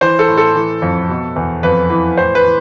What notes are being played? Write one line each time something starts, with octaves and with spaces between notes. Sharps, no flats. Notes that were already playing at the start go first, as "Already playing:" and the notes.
E3 C5
A4
A2
A4
E3
F2
B2
E2
F2 B4
E3
A2 C5
B4
E3